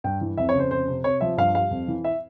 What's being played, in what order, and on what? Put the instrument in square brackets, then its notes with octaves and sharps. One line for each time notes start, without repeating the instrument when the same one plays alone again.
[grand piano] G2 G5
E3
F2 E5
C#5
C#3
C5
F2 C5
C3
C3 C#5
F3 E5
G2 F5
G3 F5
F2
E3
E5